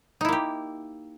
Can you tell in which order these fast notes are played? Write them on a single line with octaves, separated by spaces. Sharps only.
D#4 E4 A#3 G4